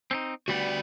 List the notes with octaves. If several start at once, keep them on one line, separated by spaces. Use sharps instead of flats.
C4 C#4 D#4
D2 G3 B3 F#4 D5